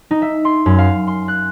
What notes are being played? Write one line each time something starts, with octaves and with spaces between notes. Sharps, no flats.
D#4
E5
C6
F#2
F5
C6
F#6